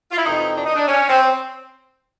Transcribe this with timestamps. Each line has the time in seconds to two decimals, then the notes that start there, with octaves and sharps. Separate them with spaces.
0.12 F4
0.18 E4
0.25 F2 C3 E3 D#4
0.57 D4
0.66 D#4
0.76 D4
0.88 C#4
1.09 C4